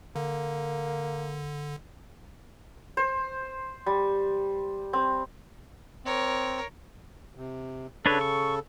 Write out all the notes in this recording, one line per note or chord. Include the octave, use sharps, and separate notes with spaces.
D3 A#3
C5
G3
C4
C4 A#4 C#5
C3
C#3 D4 A4 B4 C#5
C#6